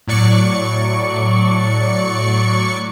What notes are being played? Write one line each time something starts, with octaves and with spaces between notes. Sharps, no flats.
A2 F#3 D5 C#6 C#7